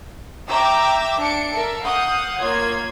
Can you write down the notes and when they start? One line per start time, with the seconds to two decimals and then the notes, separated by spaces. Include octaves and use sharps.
0.48 E5 G5 A#5 D6 E6
1.20 D4 C#7 D7
1.53 A4 A#4 E5
1.83 F5 F#5 D#6 G6
2.39 A#3 F4 C#5 G#6